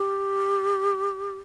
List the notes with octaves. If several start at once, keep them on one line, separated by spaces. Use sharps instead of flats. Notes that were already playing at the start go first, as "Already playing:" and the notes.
Already playing: G4